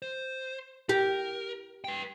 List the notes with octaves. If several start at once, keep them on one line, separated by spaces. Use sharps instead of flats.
C5
G4 A#4
B4 G5